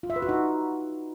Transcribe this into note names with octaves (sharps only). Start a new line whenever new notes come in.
F4
E5
B4
F#4
D#4